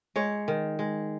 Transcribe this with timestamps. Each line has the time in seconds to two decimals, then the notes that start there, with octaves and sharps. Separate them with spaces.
0.16 G#3 C#5
0.48 D#3
0.79 G#3